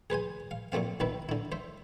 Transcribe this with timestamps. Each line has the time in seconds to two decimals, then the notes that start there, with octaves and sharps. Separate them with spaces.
0.10 G#4 B4 C5 G#5
0.51 F5
0.72 A#2 F#3 A3 C4 F5
1.00 B1 D#3 E4 B4
1.29 D3 E4
1.52 C5 E5